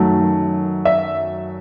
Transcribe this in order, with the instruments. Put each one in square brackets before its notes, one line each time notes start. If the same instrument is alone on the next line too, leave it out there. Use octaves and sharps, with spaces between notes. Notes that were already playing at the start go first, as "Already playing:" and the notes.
Already playing: [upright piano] F#2 D#3 F#3 A3
E5